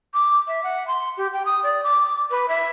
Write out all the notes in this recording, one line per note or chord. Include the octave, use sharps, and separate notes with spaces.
D6
E5
F#5
C6
G4
G5
D#6
D5
D6
B4
E5